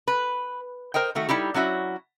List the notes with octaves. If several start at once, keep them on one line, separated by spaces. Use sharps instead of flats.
B4
A#4 C5 D#5 G5
D#3 A3 F#4
G3 D#4 E4 G4
F#3 C#4 E4 F#4